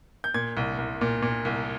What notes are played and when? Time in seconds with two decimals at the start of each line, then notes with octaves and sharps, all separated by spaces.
0.24 G6
0.34 A#2 G#6
0.57 C2
0.78 C2
1.01 A#2
1.22 A#2
1.45 C2